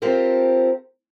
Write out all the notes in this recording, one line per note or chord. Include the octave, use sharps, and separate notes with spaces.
C4 F4 G4 A4 A#4 C5